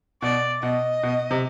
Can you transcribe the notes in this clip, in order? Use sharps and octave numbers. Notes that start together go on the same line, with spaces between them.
B2 D5
B2 D#5
B2
C3